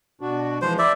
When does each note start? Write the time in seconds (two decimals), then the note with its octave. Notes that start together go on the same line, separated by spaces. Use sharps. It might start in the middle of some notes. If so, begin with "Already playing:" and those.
0.21 B2 D4 F#4
0.62 E3 F3 G#3 C5
0.79 E4 D5 E5